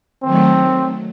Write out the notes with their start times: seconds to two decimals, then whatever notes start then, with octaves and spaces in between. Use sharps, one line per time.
0.23 D#3 F#3 A3 C4